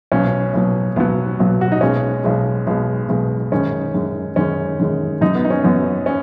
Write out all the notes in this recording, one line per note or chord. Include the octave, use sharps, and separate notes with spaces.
B1 B2 F#3 C#4
B1 B2 F#3
B1 B2 F#3 B3
B1 B2 F#3
F#4
D#4
B1 B2 G#3 C#4
B1 B2 G#3
B1 B2 G#3
B1 B2 G#3
F#2 D#3 G#3 C#4
F#2 D#3 G#3
F#2 D#3 G#3 C#4
F#2 D#3 G#3
F#2 F#3 D#4
B3
D#4
C#4
F#2 F#3 B3
C#4